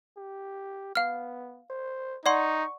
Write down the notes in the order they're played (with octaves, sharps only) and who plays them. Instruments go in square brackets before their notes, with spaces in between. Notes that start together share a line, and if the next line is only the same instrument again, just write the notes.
[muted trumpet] G4
[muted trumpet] B3 [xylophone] F5 F6
[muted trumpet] C5
[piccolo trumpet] D#4 [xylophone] D5 F#5 C6 [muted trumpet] C#6